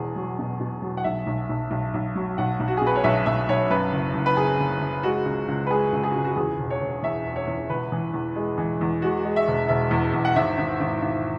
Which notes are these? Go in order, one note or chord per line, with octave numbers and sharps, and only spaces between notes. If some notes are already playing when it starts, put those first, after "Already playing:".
Already playing: E1 E2 G#4
F#3
B2
B2
F#3
F#5
B1 E5
B1
B1
B1
B1
F#3
B1 F#5
B1
F#4
G#4
B2
B4
C#5
B1 E5
B1 E5
B1 C#5
F#2 B4
F#1
F#1
B4
F#1 G#4
F#1
F#1
G#3 F#4
C#2
C#2
B4
G#3 G#4
C#2
G#4
F#4
C#2
F#4
E2 G#4
E1
C#5
E1
E2 E5
E1
C#5
E2
E1 B4
E3
E2
G#3
E3
E2
G#3 F#4
G#3
E5
E1
E1 E5
E2
E2
F#5
G#1 E5
G#1
G#1
G#1